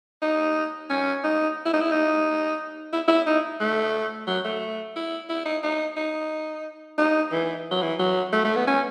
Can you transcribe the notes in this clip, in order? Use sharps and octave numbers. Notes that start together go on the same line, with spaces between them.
D#4
C#4
D#4
E4
D#4
E4
D#4
E4
E4
D#4
A3
F#3
A3
E4
E4
D#4
D#4
D#4
D#4
E3
F#3
E3
F#3
A3
A3
B3
C#4